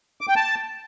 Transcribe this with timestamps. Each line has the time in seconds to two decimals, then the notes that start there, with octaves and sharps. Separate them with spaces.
0.21 D6
0.28 G5
0.36 A5